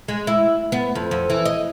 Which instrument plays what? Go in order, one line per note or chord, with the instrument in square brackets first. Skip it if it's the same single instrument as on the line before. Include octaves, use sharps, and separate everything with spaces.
[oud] G#3
E4
B3
F2
F2
E3
D#5